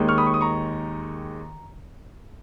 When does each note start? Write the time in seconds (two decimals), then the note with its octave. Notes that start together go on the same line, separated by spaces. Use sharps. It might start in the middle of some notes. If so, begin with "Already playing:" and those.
Already playing: D#2 D#3 G#3
0.08 C#6 F6
0.18 B5 D#6
0.26 C#6
0.34 D#6
0.41 A#5 C#6